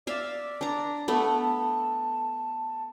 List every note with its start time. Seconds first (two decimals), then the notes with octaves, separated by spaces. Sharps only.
0.07 D5 E5 F5
0.61 D4 A#5
1.08 A3 B3 A5